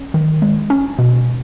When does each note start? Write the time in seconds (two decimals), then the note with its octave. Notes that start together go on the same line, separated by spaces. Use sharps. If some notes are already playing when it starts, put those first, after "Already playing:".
Already playing: C#4
0.14 D#3
0.42 G#3
0.70 C#4
0.99 B2